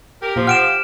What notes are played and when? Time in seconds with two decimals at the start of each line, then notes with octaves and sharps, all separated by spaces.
0.22 G4 A#4
0.36 A#2 F3
0.47 F#5 G5 F6 D7 E7